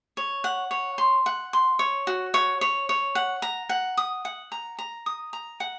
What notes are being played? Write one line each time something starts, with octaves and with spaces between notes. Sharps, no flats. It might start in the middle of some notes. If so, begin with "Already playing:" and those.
C#5
F#5
C#5
C6
F#5
C6
C#5
F#4
C#5
C#5
C#5
F#5
A#5
F#5
D#6
F#5
A#5
A#5
D#6
A#5
F#5